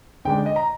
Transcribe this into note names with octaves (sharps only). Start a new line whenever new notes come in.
D2 D3 G#3 D4 G5
D#5
A#5